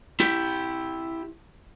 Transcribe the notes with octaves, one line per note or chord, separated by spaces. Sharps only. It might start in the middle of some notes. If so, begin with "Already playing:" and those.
E4 G4